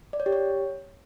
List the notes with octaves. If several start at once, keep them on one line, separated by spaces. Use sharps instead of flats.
D5
C#5
G4
C#5